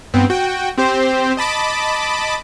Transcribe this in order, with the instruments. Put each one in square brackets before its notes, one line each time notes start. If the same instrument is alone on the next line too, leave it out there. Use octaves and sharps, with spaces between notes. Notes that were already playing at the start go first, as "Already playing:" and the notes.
[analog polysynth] G2 B3 C4
F#4 G5
C4 G4 C5
D#5 A5 B5 D6